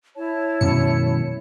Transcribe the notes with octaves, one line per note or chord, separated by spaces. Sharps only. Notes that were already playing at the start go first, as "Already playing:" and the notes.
E4 C#5 A5
F#2 B2 D#3 G#3 C#7